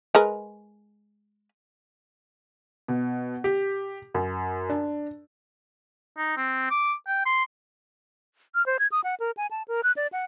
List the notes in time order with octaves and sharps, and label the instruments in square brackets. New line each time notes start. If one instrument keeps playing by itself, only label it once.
[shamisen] G#3 A#4 B4
[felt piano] B2
G4
F#2
D4
[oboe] D#4
C4
D6
G5
C6
[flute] F6
C5
G#6
D#6
F#5
A#4
G#5
A5
A#4
F#6
D5
F#5